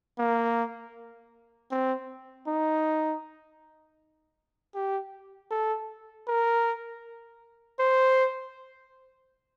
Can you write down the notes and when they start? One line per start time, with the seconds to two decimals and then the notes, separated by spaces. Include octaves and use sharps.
0.19 A#3
1.71 C4
2.47 D#4
4.75 G4
5.51 A4
6.27 A#4
7.80 C5